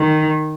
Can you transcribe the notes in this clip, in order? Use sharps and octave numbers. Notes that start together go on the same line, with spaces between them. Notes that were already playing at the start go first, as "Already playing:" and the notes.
Already playing: D#3